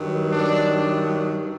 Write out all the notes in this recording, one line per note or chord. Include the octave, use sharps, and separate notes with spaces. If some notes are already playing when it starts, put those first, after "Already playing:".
Already playing: G2 D#3 F#3
D4